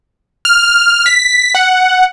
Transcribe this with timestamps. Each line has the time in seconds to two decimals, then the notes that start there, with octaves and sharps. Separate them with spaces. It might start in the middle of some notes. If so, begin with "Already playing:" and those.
0.45 F6
1.06 B6
1.55 F#5